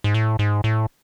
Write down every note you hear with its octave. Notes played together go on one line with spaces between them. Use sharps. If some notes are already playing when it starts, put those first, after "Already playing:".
G#2
A2
G#2
A2